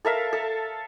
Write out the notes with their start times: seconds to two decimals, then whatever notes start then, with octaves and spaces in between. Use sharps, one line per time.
0.05 A4 A#4 E5 F5
0.33 A4